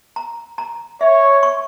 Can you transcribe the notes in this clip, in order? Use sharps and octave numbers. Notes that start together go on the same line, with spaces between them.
A#5
A#5
C#5 E5
C#6